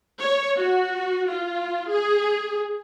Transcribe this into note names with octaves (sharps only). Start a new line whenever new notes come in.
C#5
F#4
F4
G#4